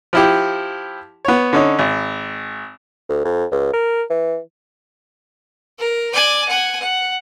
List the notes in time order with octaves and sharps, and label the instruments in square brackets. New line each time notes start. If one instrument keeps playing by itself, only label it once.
[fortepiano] F3 E4 G4
B3 C#5
D3 C#4 D#4
G#1
[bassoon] D2
F2
C#2
A#4
E3
[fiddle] A#4
D5 G#5
F#5 G#5
F#5